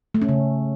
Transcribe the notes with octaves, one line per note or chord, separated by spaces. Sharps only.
A3
C#4
C#3